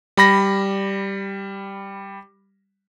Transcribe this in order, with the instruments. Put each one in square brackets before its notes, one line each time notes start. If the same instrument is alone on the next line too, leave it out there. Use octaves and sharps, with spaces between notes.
[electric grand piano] G3 B5 A#6